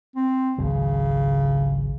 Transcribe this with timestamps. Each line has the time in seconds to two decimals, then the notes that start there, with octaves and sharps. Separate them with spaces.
0.16 C4
0.58 G#1 C#2 C#3 F#3